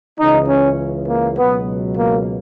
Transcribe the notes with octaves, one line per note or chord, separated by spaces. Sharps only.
C#2 C#3 E3 D#4
C#4
A#3
C#2 B2 F#3 B3
A#3